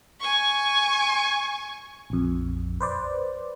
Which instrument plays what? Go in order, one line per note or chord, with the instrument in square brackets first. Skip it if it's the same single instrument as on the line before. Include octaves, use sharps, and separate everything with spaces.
[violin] G#5 C#6
[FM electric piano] A#1 F2
B4 C5 D5